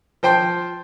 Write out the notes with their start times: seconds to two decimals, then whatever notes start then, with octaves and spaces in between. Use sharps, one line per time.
0.23 F3 C5 G5 C6